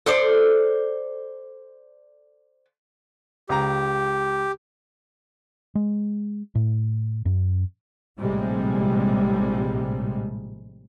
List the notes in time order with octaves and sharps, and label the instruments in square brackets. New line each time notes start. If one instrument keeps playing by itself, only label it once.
[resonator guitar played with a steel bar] A4 C5 D5
[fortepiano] C#2 A#5 [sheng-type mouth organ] G4
[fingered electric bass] G#3
A2
F#2
[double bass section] A#1 A2 C3 G3 G#3